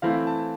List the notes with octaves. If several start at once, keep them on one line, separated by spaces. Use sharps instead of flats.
E3 A3 C4 E4 F5
A5